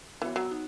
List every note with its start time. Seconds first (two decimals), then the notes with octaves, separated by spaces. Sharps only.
0.22 E3 B3 F#4 C#5
0.36 F#3
0.51 D#4 F#4